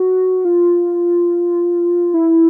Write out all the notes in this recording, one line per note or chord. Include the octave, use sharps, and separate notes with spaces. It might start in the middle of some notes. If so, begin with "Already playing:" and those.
Already playing: F#4
F4
E4